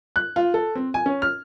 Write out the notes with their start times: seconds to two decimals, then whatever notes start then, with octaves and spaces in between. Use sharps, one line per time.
0.16 F#6
0.36 F4
0.54 A4
0.75 C4
0.94 G#5
1.06 C#4
1.22 F6